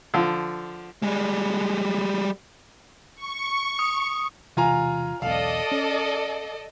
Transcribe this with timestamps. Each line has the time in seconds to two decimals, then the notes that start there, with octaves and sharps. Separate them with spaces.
0.14 D3 F3
1.02 G3 G#3
3.15 C#6
3.79 D#6
4.57 E1 C3 E3 F4 G#5 A#5
5.22 B1 E2 A4 D5 D#5 F5
5.71 C#4